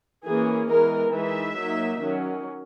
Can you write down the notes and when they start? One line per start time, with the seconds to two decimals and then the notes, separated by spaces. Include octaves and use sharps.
0.25 E3 A#3 C#4 G#4
0.68 E3 G#3 B3 A#4
1.12 E3 G#3 D#4 E5
1.57 F#3 A#3 D#4
2.00 D#3 F#3 C#4